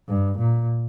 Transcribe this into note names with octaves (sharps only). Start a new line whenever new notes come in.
G2
A#2